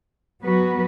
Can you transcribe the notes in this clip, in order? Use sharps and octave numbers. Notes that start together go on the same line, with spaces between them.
F#3 B3 F#4 B4